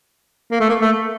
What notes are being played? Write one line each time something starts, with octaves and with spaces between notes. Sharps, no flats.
A#3
A3
A#3
A3